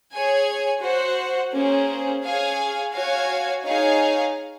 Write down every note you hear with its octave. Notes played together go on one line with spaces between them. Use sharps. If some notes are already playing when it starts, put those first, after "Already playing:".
G#4 C#5 G#5
F#4 C5 F#5
A#3 C#4 G#4 C5
G#4 C#5 F5 G#5
F#4 C#5 F5 G#5
D#4 G#4 C#5 F5 G#5